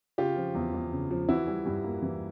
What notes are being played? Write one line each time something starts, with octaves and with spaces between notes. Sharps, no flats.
C#3 F4 G4
F3
E2
E2
C#3
F3
E3 E4 F#4
G3
G2
A#3
E3